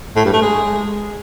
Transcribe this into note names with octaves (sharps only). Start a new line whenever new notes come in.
A2
G2
A3
G#3